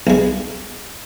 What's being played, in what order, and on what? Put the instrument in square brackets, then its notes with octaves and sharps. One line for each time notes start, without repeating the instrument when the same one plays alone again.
[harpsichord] B1 G#3